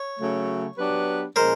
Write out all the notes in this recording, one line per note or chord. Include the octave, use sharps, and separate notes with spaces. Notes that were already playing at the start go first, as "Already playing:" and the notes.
Already playing: C#5
C#3 F#3 A3
F#3 B3 D4 G4 B4
A#2 F3 G#3 C#4 A#4 C5